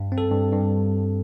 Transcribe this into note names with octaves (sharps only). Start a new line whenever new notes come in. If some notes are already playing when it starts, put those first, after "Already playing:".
Already playing: G2
C4
A4
G2
G2